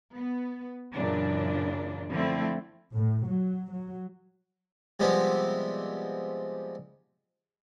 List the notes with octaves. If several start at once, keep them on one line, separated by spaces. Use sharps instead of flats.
B3
F#2 A#2 C#3 E3 D4
D3 F3 A3 C4 E4
A2
F#3
F#3
C3 F3 G3 G#3 B3 C4